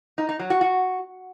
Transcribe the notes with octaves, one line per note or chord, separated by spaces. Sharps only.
D#4
D#4
F#3
F#4
F#4